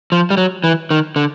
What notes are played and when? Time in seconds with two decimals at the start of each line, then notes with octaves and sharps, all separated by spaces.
0.12 F3
0.30 G3
0.37 F#3
0.64 E3
0.91 D#3
1.16 D3